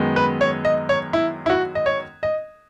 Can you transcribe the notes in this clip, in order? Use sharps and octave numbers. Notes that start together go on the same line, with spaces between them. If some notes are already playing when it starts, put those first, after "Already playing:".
Already playing: F#2 D#3 G#3 B3
B4
C#5
D#5
C#5
E4
E4
F#4
D#5
C#5
D#5